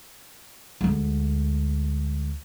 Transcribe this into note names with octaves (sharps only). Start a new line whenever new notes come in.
D2 G#3